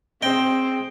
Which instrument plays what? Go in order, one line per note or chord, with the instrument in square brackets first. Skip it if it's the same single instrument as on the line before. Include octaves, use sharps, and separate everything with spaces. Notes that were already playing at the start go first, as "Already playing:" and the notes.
[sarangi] C4 [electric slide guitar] G#4 C5 D#5 [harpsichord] G5